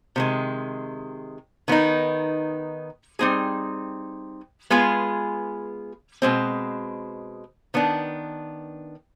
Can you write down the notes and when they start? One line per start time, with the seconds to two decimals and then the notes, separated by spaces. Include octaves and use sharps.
0.16 C3 D#3 G#3
1.68 D#3 B3 D#4
3.19 G3 C4 D#4 G#4
4.70 G#3 B3 F4 G#4
6.22 B2 G#3 C4
7.74 D#3 B3 D4